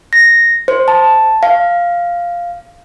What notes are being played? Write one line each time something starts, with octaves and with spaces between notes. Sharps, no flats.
A#6
C5
A5
F5